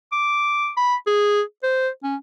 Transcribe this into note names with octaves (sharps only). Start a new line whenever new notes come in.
D6
B5
G#4
C5
C#4